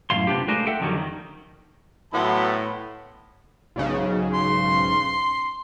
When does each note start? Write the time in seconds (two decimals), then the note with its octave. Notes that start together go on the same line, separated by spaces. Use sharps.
0.10 F#2 A2 E3 F5 C6
0.27 C3 A#3 B3 D4 F4 G4
0.48 G#3 A3 D4 F4 A#4 C5
0.67 A4 E5 F#5 G5
0.80 F2 D3 D#3 F#3 G3
0.97 D#3
2.14 A2 F#3 B3 E4 A5 B5 C6
3.76 B1 G#2 C#3
4.33 C6